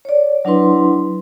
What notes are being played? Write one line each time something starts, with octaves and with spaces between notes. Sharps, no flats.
C#5 D5
F#3 D4 E4 B4 C6